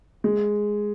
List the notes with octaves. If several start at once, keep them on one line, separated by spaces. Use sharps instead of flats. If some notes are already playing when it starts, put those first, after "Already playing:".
G#3